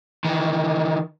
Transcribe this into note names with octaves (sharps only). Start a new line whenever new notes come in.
D#3 E3